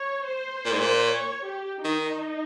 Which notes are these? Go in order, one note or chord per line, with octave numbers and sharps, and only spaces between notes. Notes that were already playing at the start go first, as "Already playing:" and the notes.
Already playing: C#5
C5
A#2
G#2
A#2
C#5
G4
D#3 D#4